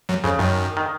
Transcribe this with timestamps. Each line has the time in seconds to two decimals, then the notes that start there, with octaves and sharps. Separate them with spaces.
0.09 F#2
0.24 F2 C#3
0.39 F#2 D#3
0.77 D#3